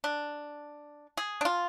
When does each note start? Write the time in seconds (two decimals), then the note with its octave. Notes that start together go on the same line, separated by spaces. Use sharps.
0.04 D4
1.17 G#4
1.41 D4
1.45 F4